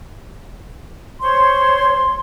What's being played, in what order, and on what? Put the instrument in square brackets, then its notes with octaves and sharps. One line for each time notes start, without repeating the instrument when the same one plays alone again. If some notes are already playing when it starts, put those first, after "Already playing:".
[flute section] C5 C#5 [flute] C6